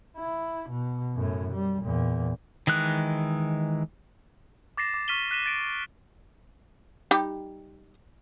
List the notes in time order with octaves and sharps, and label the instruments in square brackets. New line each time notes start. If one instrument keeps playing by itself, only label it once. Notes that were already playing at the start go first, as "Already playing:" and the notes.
[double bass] E4
B2
F#2 A2
G3
E2 A#2
[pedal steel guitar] D#3 E3 G#3 F#6
[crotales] D6 A6 A#6 C7 E7
D6
C#6 F6 B6 D#7 E7 G7
F#6 B6 D#7 E7 G7
A6 D7
[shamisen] G3 D#4 G4